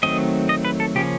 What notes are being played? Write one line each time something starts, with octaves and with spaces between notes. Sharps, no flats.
D#3 F#3 A3 C4 D#5
D#5
B4
A4
C#3 F3 A#3 C#4 G4